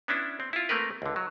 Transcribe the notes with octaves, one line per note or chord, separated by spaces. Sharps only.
B3 C#4 D4 E4
C4
E4 F4
A3 A#3 C4 A#4 B4
C#2 D3
F#3